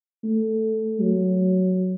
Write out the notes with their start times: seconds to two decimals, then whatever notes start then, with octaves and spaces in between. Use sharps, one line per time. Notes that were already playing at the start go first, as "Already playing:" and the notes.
0.24 A3
1.01 F#3